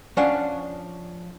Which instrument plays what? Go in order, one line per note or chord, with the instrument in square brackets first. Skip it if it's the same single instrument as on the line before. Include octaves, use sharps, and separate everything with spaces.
[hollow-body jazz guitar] F3 C#4 D4 F5 F#5